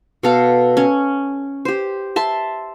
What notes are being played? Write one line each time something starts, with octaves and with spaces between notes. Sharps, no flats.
B2 A4 F5
C#4
G4 C5
E5 A5 C6